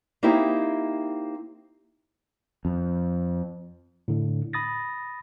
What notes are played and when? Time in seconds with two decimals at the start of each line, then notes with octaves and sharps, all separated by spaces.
0.23 A#3 C4 D#4 E4 G4
2.65 F2
4.08 A2 D3
4.53 B5 D#6 A6 A#6